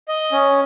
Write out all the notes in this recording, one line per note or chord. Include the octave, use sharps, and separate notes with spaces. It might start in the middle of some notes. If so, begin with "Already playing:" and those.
D#5
C#4